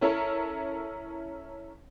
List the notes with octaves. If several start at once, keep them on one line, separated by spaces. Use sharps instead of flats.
C#4 E4 A4 A#4 C#5